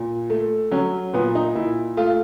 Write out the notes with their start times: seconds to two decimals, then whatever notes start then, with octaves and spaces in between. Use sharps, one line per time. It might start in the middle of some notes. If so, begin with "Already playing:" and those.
Already playing: A#2
0.30 A3
0.71 F#3 C#4
1.13 A#2 B3
1.35 D#4
1.55 A#2 E4
1.97 A3 F4